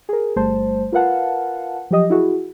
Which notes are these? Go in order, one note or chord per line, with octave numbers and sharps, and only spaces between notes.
G#4 A#4
G1 G3 A3 C5 A5
F4 A#4 B4 F5 F#5 A5
F3 F#3 G4 D#5 D#6
E4 F#4 G#4